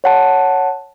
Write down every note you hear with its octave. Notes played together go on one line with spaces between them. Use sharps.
C#5 F#5 A5